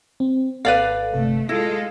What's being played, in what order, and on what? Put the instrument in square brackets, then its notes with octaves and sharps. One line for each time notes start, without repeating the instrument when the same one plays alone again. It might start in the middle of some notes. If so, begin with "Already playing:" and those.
[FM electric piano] C4
[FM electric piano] G#1 A4 [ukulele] B4 D5 F5
[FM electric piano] G1 C3 A4 [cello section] A3
[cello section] G#3 F4 A4 [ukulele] E4 [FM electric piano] A#6